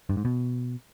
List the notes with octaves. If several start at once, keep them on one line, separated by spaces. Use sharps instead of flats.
G2
G#2
B2